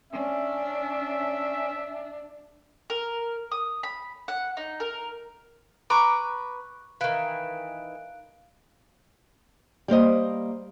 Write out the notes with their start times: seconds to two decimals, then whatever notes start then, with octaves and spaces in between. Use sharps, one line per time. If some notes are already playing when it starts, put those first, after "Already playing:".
0.13 C#4 D4 E5
2.90 A#4
3.52 D#6
3.83 B5
4.28 F#5
4.57 D#4
4.80 A#4
5.90 B4 A#5 C#6 D6 F#6
7.01 D#3 E3 F5 F#6 D7
9.88 G3 A#3 C5 D#5